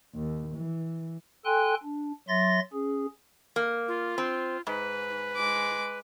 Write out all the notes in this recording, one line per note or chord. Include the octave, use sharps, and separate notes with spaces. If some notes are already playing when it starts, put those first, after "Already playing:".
D#2
E3
A4 G5 G#5 C6 F#6
D4
F#3 E5 C6 A6 A#6
C#4 G#4
A#3
F4
C4
G#2 B4
G#3 D6